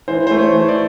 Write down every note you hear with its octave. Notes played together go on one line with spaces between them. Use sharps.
E3 C5
A3 C5
C#5
E3
D5